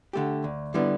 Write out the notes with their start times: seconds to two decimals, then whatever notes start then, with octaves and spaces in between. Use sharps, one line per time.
0.13 D3 A3 G4
0.44 D2
0.74 D3 G3 B3 E4